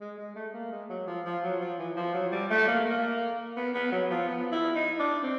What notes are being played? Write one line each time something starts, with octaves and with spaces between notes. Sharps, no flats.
G#3
G#3
A3
A#3
G#3
F#3
F3
F3
F#3
F3
E3
F3
F#3
G3
A3
A#3
A#3
B3
B3
F#3
F3
B3
E4
D#4
D4
C4